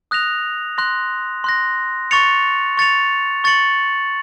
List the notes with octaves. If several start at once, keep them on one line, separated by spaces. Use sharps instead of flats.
D#6 F#6 A#6 F7
C6 F#6 A#6
C6 F#6 A#6
C#6 A6 C#7 F7
C#6 A6 C#7 F7
C#6 A6 C#7 F#7